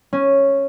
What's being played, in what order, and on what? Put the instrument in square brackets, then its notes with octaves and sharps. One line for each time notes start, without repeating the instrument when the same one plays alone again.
[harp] C#4